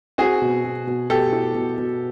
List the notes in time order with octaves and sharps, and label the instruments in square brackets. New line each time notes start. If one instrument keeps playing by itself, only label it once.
[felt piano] C4 [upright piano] F#4 G#4
[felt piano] B2
B2
B2
[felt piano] B2 [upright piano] G4 A4
[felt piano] E4
B2
B2